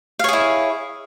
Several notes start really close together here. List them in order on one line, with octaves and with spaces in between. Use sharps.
F5 C#5 G#4 E4